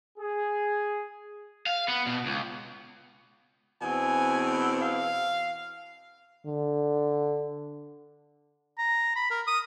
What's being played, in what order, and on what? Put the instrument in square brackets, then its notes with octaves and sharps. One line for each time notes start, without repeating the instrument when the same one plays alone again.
[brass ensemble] G#4
[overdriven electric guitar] F5
B3
B2
C#2
[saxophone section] E2 B2 C4 [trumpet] G#5
[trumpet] F5
[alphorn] D3
[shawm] A#5
B5
A#4
D#6